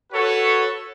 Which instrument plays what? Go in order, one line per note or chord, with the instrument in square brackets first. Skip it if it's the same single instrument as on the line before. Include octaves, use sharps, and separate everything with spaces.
[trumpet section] F#4 A4 B4 C#5